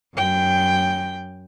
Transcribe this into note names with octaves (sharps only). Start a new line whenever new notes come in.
F#2 G5